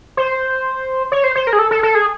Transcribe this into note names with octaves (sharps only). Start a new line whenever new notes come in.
C5
C#5
C5
C5
A#4
G#4
A4
A4
A4
G#4